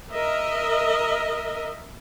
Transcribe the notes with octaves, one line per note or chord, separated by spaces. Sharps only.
A#4 D#5 E5